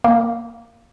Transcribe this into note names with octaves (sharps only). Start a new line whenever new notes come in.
A#3